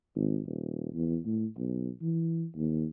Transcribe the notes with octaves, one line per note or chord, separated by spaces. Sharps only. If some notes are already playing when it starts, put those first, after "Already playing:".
G#1
D#1
E2
A2
B1
E3
D#2